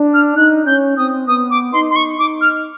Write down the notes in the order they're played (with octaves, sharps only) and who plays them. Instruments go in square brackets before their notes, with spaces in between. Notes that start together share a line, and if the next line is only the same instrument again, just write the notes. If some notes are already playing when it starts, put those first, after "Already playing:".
Already playing: [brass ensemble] D4
[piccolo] F6
[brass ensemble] D#4 [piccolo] F#6
[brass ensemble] C#4 [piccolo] G6
[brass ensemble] C4 [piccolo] D#6
[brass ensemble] B3 [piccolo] D#6
[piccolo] D6
[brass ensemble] D#4 [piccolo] C6
[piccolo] C6
C#6
[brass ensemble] D#4 [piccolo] D6
[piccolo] F6